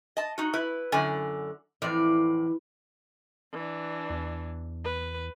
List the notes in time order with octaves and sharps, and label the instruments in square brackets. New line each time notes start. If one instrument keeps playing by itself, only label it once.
[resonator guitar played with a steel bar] D#5 A5
D#4 F#4
E4 B4
F#2 D3 G#5
[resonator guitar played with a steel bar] F2 A2 D5 [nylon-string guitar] E3
[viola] E3 D4
[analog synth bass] E2
[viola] B4